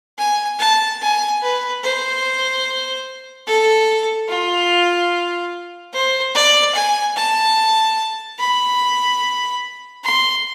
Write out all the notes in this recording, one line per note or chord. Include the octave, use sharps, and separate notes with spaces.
G#5
A5
G#5
B4
C5
A4
F4
C5
D5
G#5
A5
B5
C6